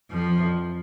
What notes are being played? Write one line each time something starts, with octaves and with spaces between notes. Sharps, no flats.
F2 F3